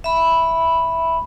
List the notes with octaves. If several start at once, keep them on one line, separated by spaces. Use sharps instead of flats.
E5 B5